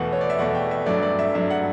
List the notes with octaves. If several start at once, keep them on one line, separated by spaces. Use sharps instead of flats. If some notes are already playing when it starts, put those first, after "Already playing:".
Already playing: E2 B2 A3 F#5
C#5
D5
E5
E2 B2 A3 F#5
G5
E5
G2 F#3 A3 D5
D5
E5
G2 F#3 A3 E5
F#5